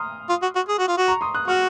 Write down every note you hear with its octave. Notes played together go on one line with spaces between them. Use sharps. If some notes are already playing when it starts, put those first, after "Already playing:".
Already playing: A#5 C6 D#6 F6
F4
F#4
F#4
G#4
F#4
F4
F#4
A#5 C#6
C6 D#6
D#6 F#6
F#4 C#6 F6